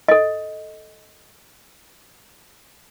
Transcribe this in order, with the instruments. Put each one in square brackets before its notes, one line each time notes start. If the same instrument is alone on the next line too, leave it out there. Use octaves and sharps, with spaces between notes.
[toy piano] A4 D#5